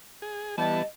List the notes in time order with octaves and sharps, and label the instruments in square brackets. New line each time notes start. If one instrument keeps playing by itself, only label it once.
[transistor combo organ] G#4
[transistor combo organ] E3 B3 [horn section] G3 A5 [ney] D#5